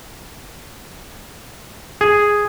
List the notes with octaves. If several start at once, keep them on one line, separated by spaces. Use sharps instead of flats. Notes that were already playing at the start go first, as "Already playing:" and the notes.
G#4